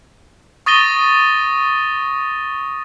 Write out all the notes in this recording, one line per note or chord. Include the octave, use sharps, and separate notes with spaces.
C#6 D#6 A6 A#6 D#7 G7